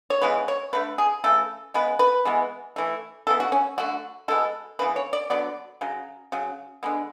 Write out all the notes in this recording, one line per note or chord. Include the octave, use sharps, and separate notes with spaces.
C#5
C#3 E3 G#3 B3 B4
C#5
D3 A3 B4
G#4
C#3 E3 A3 A4
C#3 G#3 B3 B4
B4
E3 G#3 B3
E3 A3
C#3 E3 B3 A4
F#4
C#4
D3 F#3 A3 F#4
B2 G#3 B3 A4
C#3 E3 B3 B4
C#5
D5
D3 F#3 B3 D5
C#3 F#3
C#3 F#3
D3 G#3 B3